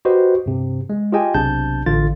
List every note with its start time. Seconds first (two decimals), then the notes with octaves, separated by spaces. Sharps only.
0.05 F#4 G4 B4 C5 D#5
0.46 G2 C3
0.90 G#3
1.12 F4 G4 G#4 D#5 G5 G#5
1.34 B1 C3 D4 A5 G6
1.86 A1 D3 F4 A6